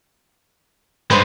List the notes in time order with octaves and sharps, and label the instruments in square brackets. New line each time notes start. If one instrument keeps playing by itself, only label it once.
[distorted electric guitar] G2 G#3 [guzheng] B4 C5